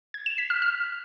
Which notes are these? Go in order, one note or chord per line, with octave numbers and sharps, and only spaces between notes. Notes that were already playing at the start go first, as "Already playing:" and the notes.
G#6
E7
B6
F6
F6